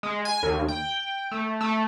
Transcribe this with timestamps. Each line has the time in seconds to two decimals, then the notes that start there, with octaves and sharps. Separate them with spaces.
0.03 G#3
0.25 G#5
0.43 D#2
0.68 G5
1.31 A3
1.61 A3